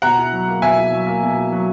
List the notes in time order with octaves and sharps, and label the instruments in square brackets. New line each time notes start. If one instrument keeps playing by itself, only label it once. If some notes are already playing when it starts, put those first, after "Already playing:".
[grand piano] B2 [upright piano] F#5 A#5
[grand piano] E4
F#3
A#3
[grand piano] B2 [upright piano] E5 G#5
[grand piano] E4
F#3
A#3
B2
E4
F#3